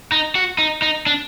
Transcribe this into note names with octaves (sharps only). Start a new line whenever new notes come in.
D#4
F#4
D#4
D#4
D4